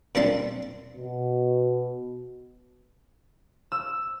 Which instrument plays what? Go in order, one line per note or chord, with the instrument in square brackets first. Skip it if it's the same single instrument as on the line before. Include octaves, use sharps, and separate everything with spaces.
[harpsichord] A#2 G3 C4 D4 A5 C6
[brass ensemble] B2
[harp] E6